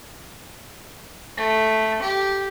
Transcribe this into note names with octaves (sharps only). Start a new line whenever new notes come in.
A3
G4